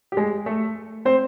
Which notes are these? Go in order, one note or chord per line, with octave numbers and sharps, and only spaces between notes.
G4
G#3 G#4
A3 A4
C4 C5